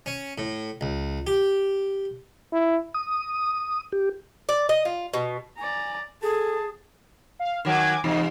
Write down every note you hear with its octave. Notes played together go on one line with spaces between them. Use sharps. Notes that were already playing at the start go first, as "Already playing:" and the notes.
C#4
A2
C#2
G4
E4
D#6
G4
D5
D#5
F4
B2
D5 G#5 A#5
G#4 A4 A5
F5
D#3 F#3 G#5 D6 G#6
E2 G#2 C3 D#4